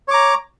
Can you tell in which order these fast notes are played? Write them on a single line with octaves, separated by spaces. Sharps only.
C#5 D6 A#5